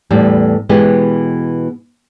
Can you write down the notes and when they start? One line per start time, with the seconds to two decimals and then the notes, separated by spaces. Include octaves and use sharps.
0.10 E2 A2 G3
0.69 B2 E3 G#3 B3 G4